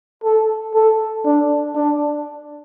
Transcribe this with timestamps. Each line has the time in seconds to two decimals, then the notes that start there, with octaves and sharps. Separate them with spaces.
0.24 A4
0.74 A4
1.25 D4
1.75 D4